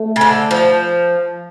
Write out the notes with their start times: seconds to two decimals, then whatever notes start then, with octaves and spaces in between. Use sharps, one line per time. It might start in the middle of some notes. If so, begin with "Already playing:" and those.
Already playing: A3
0.16 C#3
0.21 D3
0.51 F3